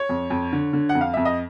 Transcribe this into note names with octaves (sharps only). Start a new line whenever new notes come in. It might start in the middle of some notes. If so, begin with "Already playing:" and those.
Already playing: C#5
F2
F2
D3
D3
F#5
F2
F5
F2 E5
D#5